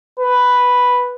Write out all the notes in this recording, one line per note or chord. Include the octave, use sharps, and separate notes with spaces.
B4